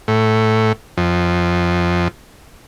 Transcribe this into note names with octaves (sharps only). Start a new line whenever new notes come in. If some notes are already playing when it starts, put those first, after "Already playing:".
A2
F2